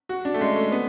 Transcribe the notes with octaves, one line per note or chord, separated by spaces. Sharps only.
F#4
D4
A3
G#3
A3
B3